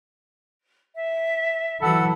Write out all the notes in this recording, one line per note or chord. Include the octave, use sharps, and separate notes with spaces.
E5
E3 F#3 A4 F#5 B5 E6